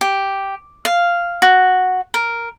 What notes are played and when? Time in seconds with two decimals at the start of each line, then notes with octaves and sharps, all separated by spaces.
0.01 G4
0.85 F5
1.42 F#4
2.14 A#4